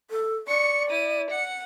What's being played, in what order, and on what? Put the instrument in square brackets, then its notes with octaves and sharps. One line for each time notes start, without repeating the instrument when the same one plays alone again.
[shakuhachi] A4
[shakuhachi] D5 [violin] C#6 C#7
[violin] E4 D#7
F#5 C#7